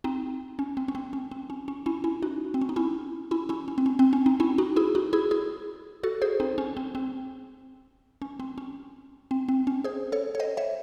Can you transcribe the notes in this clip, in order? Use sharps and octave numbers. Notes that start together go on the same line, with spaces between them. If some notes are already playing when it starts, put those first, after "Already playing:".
C4 D#4
C#4
C4
C#4
C4
C#4
C4
C#4
C#4
C#4 E4
C#4 E4
D#4 F#4
C4
C#4
D#4
C#4 E4
C#4 E4
C#4 E4
C#4
C4
C#4
C4
C#4
C4 D#4
C#4 E4
D#4 F#4
E4 G#4
D#4 F#4
E4 G#4
E4 G#4
F#4 A4
G#4 C5
C4 D#4
C#4
C4
C4
C#4
C4
C#4
C4
C4
C#4
G#4 C5
A4 C#5
C#5
C5 D#5
C#5 E5